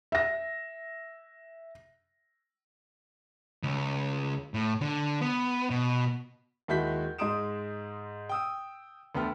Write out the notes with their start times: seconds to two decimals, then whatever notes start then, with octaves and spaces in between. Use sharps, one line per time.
0.12 E5 A#6
3.63 C#2
4.54 A2
4.82 D3
5.21 B3
5.70 B2
6.68 D#2 G#3 E4 F#4 G6 B6
7.18 G#2 G#3 C6 D#6 D7 E7
8.29 G5 D#6 E6
9.15 D2 B3 A4 G5 F6